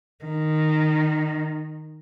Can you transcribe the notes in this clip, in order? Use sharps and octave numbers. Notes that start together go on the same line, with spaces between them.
D#3